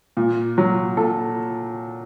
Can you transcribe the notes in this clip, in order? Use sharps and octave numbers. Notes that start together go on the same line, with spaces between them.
A#2
F#3
A#2 A4